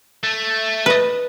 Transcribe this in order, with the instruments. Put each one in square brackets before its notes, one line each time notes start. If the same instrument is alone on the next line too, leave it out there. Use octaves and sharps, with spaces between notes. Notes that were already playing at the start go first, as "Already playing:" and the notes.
[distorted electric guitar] A3
[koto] B4 D#5